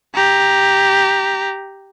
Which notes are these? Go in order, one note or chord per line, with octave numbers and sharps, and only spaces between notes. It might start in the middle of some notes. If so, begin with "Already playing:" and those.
G4 A#5